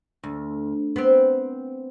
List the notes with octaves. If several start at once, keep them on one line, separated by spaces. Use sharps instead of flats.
D2
B3 C4